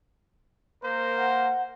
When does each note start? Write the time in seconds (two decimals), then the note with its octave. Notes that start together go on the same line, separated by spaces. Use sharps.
0.83 A#3 A#4 C5
1.17 F#5